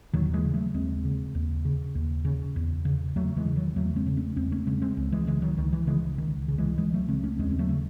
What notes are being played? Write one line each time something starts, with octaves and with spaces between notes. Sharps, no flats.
D#2 D#3 F#3
E3 G#3
C#3
F#3 A3
D#2 G#3 C4
C#3
D#2
C#3
D#2
C#3
E2
C#3
E2 F#3 A3
E3 G#3
C#3
D#3 F#3
E2 F#3 A3
G#3 C4
C#3
A3 C#4
E2 G#3 C4
A3 C#4
C#3 G#3 C4
G#3 C4
C#2
E3 G#3
C#3 E3 G#3
D#3 F#3
C#2 D#3
E3
C#3 E3 G#3
C#2 D#3
C#3
E3 G#3
C#2 E3 G#3
F#3 A3
C#3 G#3 C4
A3 C#4
D#2 G#3 C4
C4
F#3 A3
C#3